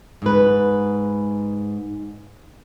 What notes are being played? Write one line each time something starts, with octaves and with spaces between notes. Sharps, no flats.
G#2 B4